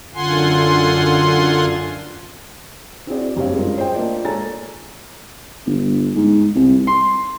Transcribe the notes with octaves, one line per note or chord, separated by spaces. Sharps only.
F#2 D3 F4 F#5 G#5 C6
C4 E4 F#4 G#4 D5
F#1 G2 C4 C#5 F5
G#3 C#4 F4 A#4
G#4 C5 C#5 D#5 G5
A3 A#3 F4 D5
G#3 A4 C#5 G#5 A#5 A6
G1
G#2
C2
C6